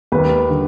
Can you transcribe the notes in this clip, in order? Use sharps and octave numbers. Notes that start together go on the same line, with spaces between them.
D#2 B4
D3